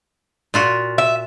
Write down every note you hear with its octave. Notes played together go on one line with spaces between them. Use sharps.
A#2 F4 F#4
E5